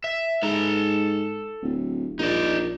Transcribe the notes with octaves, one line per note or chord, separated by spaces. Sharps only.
E5
G#2 A4 A#5
D1
A#1 D#4 D5